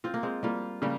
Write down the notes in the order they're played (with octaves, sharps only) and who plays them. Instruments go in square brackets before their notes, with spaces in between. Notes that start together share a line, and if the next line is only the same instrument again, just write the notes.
[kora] C4 [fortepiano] F4
[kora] A#3
G#3 C4
[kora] G3 A#3 [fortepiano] F4
[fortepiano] C#3 [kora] G3 A#3